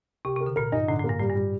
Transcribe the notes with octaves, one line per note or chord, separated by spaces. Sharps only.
C3 G4
C3 A#4
D3
A#2 A#4
G2 D#4
A2 D3
A2
G2 A#3
A2 G3
G2
G3